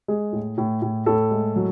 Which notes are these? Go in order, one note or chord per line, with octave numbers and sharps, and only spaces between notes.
G#3 G#4
A2
A2
A2
A2 A4
G#3
F#3